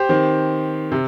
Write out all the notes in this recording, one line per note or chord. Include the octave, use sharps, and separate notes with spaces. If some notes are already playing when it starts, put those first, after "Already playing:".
Already playing: G4 C5
D#3 C4
C3